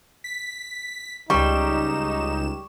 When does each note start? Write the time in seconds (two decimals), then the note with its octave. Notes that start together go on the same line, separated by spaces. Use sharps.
0.24 B6
1.30 C#2 G3 D#4 C#6 E7